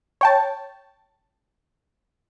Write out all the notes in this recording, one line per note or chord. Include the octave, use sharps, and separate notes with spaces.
C#5 G5 A5